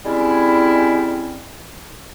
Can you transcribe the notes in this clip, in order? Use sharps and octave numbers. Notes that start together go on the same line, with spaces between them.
G3 G#3 C4 C#4 E4